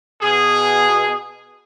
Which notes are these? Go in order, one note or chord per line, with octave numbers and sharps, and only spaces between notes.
B2 G#4